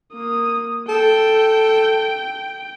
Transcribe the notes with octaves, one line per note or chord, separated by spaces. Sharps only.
A#3 D#6
A4 G5